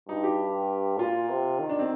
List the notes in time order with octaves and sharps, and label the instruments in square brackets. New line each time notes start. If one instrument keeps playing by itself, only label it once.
[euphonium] G2 [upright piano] D#4
[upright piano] G4
[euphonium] A#2 [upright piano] F4
[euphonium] C3
D#3
[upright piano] D4
C4